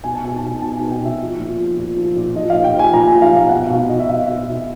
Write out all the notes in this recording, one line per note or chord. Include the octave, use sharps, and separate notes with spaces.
B2 G#5
A5
B2 G#5
A5
B2 G#5
B2 A5
B2 G#5
G5
B2 E5
F3
A#2
F3
A#2
F3
A#2
F3 D#5
A#2 F5
G5
F3
G#5
A#2 A#5
G#5
F3
F5
A#2 F5
B2 F#5
F5
B2
B2 D#5
E5
B2 F5
B2 E5
B2 E5